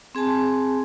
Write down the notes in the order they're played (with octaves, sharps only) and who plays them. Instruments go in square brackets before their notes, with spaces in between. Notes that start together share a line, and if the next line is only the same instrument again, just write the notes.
[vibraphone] C4 G#4 G#5 A5